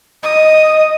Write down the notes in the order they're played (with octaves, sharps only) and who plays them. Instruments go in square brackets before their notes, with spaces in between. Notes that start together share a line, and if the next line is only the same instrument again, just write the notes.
[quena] D#5 [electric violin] D#6